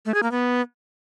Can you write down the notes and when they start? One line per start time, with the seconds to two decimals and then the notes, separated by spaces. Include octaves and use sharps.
0.06 A3
0.14 G#4
0.23 A#3
0.31 B3